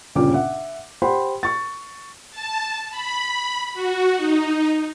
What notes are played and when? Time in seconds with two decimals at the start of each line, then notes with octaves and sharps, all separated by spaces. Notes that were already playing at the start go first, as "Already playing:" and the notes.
0.15 G1 A#2 C#3 C#4 G5 D6
0.34 E5 F#5
1.02 G4 C5 F#5 G5 B5 C6
1.43 C#6 A6
2.31 A5
2.90 B5
3.74 F#4
4.17 D#4